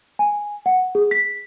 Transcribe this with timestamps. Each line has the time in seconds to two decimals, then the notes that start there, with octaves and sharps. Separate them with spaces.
0.19 G#5
0.66 F#5
0.95 G#4
1.11 B6